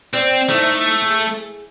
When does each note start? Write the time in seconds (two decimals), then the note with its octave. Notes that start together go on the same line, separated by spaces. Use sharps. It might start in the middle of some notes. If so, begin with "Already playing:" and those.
0.14 C4 C5 D5
0.49 A3 D#4 E4
1.02 G#4